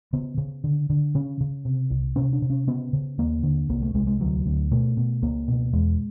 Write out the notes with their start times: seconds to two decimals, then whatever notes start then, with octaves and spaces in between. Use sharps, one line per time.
0.13 C#3 B3
0.38 C#3
0.64 D3
0.90 D3
1.15 C#3 C#4
1.41 C#3
1.65 C3
1.90 C2
2.16 C3 C#4
2.33 D4
2.42 C3
2.50 C#4
2.67 C#3 B3
2.93 C#3
3.18 D#2 A#3
3.43 D3
3.69 C2 A#3
3.82 A3
3.94 C2 G#3
4.07 G#3
4.20 D2 F#3
4.46 D2
4.71 B2 A3
4.97 B2
5.22 C#2 A#3
5.48 B2
5.73 E2 G#3